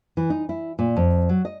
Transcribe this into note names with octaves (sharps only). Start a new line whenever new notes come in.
E3
D#4
E4
A#2
F2
F#3
D#5